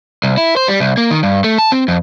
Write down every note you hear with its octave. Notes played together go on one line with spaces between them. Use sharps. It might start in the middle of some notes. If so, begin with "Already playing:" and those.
C2
E4
C5
G3
C2
A#3
D#3
G2
A3
A5
C4
F2